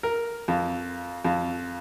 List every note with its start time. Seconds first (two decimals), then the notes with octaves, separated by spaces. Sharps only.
0.03 A#4
0.48 F2
1.25 F2